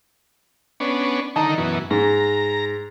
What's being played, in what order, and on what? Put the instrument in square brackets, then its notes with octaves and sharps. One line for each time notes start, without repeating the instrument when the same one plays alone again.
[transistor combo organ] B3 C#4 D4
[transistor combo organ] D3 D#3 D#4 [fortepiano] A5 A#5
[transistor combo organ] F#2 B2 E3
[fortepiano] G#2 [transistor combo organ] A#5